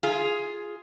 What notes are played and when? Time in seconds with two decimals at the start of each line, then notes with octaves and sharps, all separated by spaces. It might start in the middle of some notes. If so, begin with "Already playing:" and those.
0.03 F4 G#4